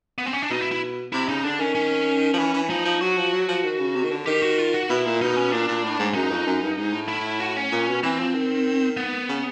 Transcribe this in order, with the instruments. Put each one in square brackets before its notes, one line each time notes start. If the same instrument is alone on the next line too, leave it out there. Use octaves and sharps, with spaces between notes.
[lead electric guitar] B3
C4
C#4
D4
[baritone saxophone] B2 [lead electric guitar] D#4
[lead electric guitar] E4
E4
[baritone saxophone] C3 [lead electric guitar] E4
[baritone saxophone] C#3 [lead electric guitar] D#4
[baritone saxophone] D3 [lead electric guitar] D4
[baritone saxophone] D#3 [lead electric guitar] C#4
[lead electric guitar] C#4
[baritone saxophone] F3
E3
E3
[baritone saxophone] F3 [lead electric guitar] D#4
[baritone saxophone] F3
[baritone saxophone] F#3 [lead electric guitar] F#4
[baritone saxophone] F3
F#3
F3
D#3
C#3
C3
D#3
D3
[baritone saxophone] D#3 [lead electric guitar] G4
[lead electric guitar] F#4
F4
F#4
[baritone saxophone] B2 [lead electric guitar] E4
[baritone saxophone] A#2
[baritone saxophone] B2 [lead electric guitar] D#4
[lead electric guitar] C#4
[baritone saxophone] A#2 [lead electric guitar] D4
[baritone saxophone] A#2
A2
G#2
[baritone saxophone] F#2 [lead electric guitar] D#4
[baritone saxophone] F2
F#2
G2
G#2
A2
[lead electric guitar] E4
F#4
C#4
[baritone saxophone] A#2
B2
[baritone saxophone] E3 [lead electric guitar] C4
[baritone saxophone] F3
D#3
[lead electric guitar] B3
[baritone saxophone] C#3